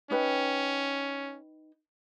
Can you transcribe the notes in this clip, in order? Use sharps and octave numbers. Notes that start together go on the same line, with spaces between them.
C#4 D#4 B4 G5